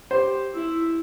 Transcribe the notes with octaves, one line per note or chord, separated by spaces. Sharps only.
G4 C5
E4